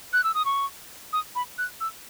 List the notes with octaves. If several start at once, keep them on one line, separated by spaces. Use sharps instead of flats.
F#6
E6
D#6
C#6
D#6
B5
F#6
E6